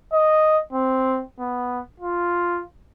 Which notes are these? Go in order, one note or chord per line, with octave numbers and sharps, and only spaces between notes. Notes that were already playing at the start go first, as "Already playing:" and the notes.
D#5
C4
B3
F4